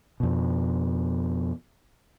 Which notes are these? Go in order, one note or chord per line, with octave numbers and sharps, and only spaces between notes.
F2 B2